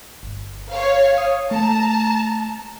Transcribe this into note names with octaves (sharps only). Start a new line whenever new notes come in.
G1
C#5 F5
D#6
A3 A5 A#5